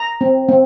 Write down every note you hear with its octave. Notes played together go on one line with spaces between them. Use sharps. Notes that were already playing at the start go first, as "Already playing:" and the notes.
Already playing: A#5
C4
C4